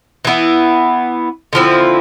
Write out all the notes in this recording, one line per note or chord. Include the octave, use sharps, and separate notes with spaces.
E3 B3 E4
D3 F3 C4 E4